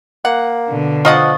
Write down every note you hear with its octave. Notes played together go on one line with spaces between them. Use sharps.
A#3 F#5
B2 D3
F3 F4 D#5 F#5 C#6 D#6 A6